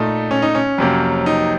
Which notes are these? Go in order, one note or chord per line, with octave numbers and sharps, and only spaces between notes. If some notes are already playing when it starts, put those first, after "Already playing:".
Already playing: A#2 A3 D#4
C#4
D#4
C#4
F2 C3 F#3 A#3
D#4